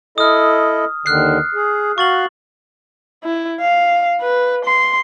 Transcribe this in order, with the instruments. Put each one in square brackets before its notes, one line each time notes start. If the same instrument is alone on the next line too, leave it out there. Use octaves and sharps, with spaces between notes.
[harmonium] E4 A4 D#5 [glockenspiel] D#6 F6
[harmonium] D#2 D3 D#3 [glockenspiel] F6 F#6 C7
[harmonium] G#4
[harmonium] F#4 F5 [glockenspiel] C#6 A6 F#7
[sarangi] E4
F5
B4
C6